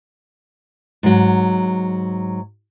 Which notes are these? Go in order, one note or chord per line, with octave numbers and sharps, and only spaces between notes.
G#2 F#3